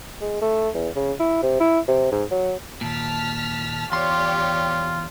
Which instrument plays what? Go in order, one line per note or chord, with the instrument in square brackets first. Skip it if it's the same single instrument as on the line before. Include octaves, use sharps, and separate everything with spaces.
[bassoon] G#3
A3
E2
C#3
E4
C3
E4
C3
G#2
F#3
[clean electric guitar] D#2 A#2 [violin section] A5 F6 B6
[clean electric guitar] E2 C6 [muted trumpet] F4 [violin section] G4 C#5 D5